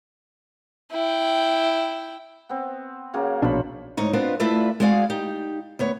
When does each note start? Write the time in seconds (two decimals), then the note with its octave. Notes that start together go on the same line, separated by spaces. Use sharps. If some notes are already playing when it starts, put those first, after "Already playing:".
0.92 E4 G5
2.49 B3 C4
3.13 C#3 F#3 A#3
3.42 A#1 B2 D4 F#4 C5 B5
3.97 D2 G#2 D#4 C#5
4.13 B3 C4 D4 F4 B4 D#5
4.40 A3 E4 F4 B4 D5 E5
4.80 G#3 F#4 G#4 D5 F5
5.10 D#4 G4
5.79 D2 B3 C#5